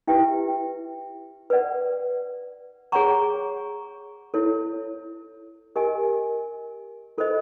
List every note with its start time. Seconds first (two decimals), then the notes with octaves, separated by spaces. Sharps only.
0.08 E4 G4 B4 E5 G5
1.50 B4 D5 F#5
2.92 G#4 C#5 F#5 A#5 C#6
4.34 E4 A4 C#5
5.76 G4 A#4 D#5 G#5
7.18 F4 A4 C5 D#5